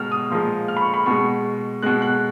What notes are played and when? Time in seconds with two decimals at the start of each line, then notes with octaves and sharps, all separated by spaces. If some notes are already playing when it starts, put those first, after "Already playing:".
Already playing: B2 G#3 F6
0.12 D#6
0.30 A#2 F3 G#3
0.68 F6
0.77 B5
0.81 C#6
0.94 B5
1.06 B2 G#3 C#6
1.83 B2 G#3 F#6
2.02 F#6